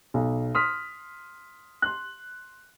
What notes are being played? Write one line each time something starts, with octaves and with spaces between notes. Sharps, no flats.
B1
C6 D#6 F6 B6
C6 F#6